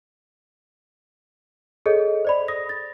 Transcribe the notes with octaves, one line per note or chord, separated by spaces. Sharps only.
G#4 A4 C#5 D#5
C5 D5 B5
D#6 A#6
A6